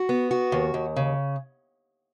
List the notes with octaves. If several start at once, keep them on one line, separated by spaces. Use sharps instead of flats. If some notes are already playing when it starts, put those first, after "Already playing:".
Already playing: F#4
B3
F#4
D#2
D#2
C#3